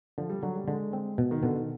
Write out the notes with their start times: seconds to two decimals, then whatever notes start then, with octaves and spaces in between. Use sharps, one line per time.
0.18 D3 F3
0.30 G3
0.43 D3 F#3
0.56 G3
0.67 D3 G#3
0.93 C4
1.18 B2
1.31 D#3
1.43 B2 D3
1.56 D#3